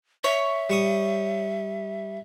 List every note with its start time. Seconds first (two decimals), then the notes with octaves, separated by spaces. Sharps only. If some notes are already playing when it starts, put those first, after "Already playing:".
0.24 C#5 E5
0.70 G3 C#6 D#6